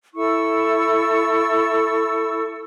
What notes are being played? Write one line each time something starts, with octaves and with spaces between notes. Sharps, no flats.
E4 A4 C#6 E6